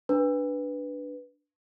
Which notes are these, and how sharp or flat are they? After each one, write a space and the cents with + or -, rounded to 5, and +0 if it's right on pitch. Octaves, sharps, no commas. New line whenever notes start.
D4 +0 B4 +0